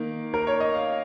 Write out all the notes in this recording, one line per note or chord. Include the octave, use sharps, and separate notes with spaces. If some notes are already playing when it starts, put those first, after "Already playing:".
Already playing: D#3 A#3
A#4
C#5
D#5
F5